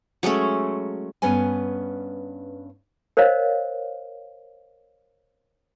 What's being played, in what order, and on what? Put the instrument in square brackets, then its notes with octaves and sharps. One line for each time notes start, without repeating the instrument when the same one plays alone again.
[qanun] F#3 G#3 A3 C#4
[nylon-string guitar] G2 B3 C#4 B4 G#5
[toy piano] A#4 C5 C#5 D#5 F5